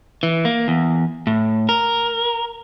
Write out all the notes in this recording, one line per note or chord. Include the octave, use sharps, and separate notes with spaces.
E3
A#3
E2
A2
A#4